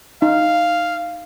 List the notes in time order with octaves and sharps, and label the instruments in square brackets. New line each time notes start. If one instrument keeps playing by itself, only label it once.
[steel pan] D#4 [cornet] F5